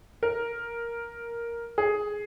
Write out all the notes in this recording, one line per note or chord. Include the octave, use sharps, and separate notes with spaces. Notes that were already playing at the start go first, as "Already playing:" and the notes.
A#4
G#4